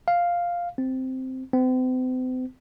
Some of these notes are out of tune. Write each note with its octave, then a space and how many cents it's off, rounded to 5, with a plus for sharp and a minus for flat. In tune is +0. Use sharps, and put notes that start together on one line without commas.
F5 +0
C4 -5
C4 -40